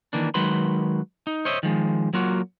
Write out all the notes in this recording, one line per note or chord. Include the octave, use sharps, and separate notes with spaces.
D#3 E3 A#3 D4
D#3 F#3 G#3 B4 B5 C6
D#4
C5 C#5 D#5 E5
D#3 F3 G#3
F#3 A#3 F4 F#4